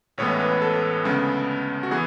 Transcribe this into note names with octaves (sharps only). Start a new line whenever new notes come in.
A1 A2 E3 G#3 B3 C#5
B4
A4
D2 C#3 G#3 B3
F#4
E3 B3 G#4